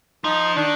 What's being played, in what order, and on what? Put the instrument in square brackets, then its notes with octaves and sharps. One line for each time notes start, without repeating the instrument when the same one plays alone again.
[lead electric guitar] F3 [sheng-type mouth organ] D#4
[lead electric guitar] D#3 [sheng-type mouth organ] D4